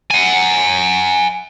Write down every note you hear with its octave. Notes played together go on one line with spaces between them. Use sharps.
F#5 G#5